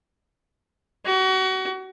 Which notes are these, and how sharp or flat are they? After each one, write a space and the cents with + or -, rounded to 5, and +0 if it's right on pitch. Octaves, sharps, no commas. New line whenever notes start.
F#4 +30